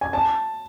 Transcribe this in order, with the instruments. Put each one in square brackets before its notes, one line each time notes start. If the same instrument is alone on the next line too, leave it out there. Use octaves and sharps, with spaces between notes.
[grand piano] G#5
A5